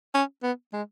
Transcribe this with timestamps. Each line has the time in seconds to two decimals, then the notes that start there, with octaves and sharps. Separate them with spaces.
0.14 C#4
0.43 B3
0.73 G#3